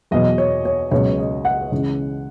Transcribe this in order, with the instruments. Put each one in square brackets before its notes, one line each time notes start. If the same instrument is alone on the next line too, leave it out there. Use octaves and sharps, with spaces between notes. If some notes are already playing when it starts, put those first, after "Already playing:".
[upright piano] E2 B2 F#3 D#5
C#5
C#5
C#2 B2 F#3 C#5
D#5
F#5
C#2 C#3 E3